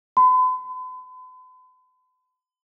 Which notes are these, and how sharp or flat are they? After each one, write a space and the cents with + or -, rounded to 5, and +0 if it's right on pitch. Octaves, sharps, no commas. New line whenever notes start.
B5 +45